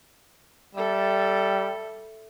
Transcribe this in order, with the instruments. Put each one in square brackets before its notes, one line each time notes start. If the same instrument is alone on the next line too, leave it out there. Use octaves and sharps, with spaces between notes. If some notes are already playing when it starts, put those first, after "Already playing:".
[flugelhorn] G3 [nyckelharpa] A4 E5